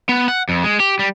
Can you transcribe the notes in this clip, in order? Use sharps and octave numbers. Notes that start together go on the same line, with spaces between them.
B3
F#5
F2
G#3
G4
G3